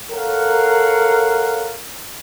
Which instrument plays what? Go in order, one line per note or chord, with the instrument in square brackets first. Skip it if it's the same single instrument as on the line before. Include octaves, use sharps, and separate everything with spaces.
[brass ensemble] A4 A#4 C#5 F5 F#5